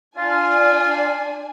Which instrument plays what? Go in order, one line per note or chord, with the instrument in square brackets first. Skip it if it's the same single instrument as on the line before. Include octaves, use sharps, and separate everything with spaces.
[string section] D4 G#5 [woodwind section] F4